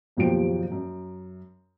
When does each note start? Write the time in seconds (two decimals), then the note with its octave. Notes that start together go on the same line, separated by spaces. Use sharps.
0.17 F#1 D#2 B2 F3 G4 D7
0.72 F#2